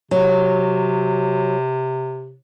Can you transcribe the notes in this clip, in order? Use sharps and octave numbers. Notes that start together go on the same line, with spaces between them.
C3 F#3